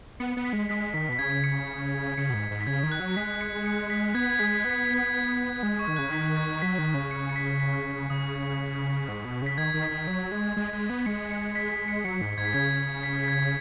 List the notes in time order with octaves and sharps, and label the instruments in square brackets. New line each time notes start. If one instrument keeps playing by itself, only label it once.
[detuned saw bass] B3 [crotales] C#7
[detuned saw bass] B3
[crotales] B6
[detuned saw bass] G#3
[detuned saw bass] G#3 [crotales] B6
[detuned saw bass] D#3 [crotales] B6
[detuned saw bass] B2 [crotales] B6
[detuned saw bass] C#3 [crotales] G#6
[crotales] C#7
[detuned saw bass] C#3 [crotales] C#7
[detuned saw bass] B2
G#2
G#2
[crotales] B6
[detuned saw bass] C#3 [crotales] G#6
[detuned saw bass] D#3
[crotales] F#6
[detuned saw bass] F#3
[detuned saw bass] G#3 [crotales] B6
[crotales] C#7
C#7
B6
[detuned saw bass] B3 [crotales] G#6
[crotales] B6
G#6
[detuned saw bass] G#3 [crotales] B6
[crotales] G#6
B6
[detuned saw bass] B3 [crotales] G#6
[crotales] B6
G#6
B6
G#6
B6
G#6
[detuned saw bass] G#3
[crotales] C#6
[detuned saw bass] D#3
[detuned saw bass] C#3 [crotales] F#6
[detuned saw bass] D#3 [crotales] B6
[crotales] G#6
[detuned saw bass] F#3 [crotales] B6
[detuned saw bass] D#3
C#3
[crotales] C#7
C#7
B6
B6
[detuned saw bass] C#3 [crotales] D#6
[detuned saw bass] G#2
B2
[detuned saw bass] C#3 [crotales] B6
[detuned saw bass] D#3 [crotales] G#6
[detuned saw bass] D#3
[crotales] B6
[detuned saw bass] D#3
F#3
G#3
G#3
G#3
B3
[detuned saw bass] G#3 [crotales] C#7
[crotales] C#7
B6
B6
C#7
[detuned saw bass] F#3 [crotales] C#7
[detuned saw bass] G#2 [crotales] B6
[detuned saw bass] G#2 [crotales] G#6
[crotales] B6
[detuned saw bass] C#3 [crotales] G#6
[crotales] B6
B6
G#6